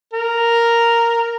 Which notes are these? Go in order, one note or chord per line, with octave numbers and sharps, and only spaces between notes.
A#4